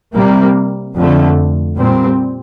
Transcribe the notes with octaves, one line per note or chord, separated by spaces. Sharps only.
C3 G3 A#3
F2 D3 A3
A#2 G3 C4